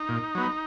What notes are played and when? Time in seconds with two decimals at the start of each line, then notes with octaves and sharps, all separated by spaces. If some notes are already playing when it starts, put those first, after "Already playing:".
Already playing: D#4
0.09 A#2
0.35 F#3 B3